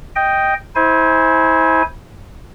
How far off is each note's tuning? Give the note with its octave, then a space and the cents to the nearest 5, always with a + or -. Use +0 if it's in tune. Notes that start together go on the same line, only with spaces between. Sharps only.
D#5 +0 G5 +0
E4 -30 C5 +0 G#5 +0